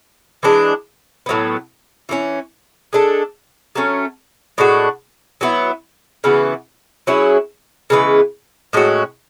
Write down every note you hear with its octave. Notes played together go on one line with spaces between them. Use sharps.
E3 G#3 D4
A2 F#3 B3
E3 A3 C#4
G#3 D4 A4
F#3 A3 C#4
A2 G#3 D4 F#4
F#3 B3 E4
C#3 E3 B3 F#4
F#3 C#4 E4 G#4
C#3 E3 G#3 B3
A2 G#3 C#4 F#4